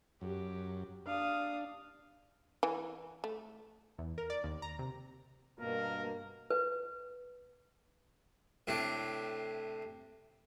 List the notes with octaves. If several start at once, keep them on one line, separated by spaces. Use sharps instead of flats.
F#2 G4
D4 F5 D#6
E3
A3
E2
A#4
D5
D#2
A#5
C3
G2 B2 A#3 A#4
B4
A2 C3 D4